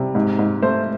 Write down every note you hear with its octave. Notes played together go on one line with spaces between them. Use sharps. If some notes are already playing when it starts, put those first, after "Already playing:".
Already playing: C3 G3
G#2
G#2
A3 C5